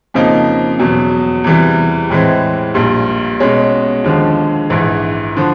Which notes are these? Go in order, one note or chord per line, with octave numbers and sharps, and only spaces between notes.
F2 C#3 F3 A#3 D#4
E2 B2 F#3
E2 C3 E3 G3
A2 E3 G#3 C4
A#1 A#2 G3
B2 G#3 C#4
D#2 D3 F3 G#3
A#1 G#2 E3
D3 F3